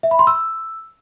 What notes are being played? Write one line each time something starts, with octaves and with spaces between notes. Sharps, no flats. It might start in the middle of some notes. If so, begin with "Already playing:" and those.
E5
B5
C6
E6